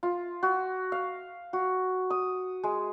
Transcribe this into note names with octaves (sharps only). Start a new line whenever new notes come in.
F4
F#4
F5
F#4
D#6
G#3